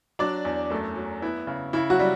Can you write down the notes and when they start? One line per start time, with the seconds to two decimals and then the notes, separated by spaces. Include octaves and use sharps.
0.19 F#3 D4 D5
0.45 E2
0.70 F#2 A3 A4
0.96 F#3
1.22 B3 E4
1.47 C#3
1.73 C#3 E4
1.90 F#3 F#4
1.99 G3